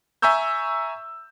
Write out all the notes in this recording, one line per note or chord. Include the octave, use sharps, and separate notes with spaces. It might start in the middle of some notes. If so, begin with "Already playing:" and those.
E5 G#5 A#5 C#6 E6 G6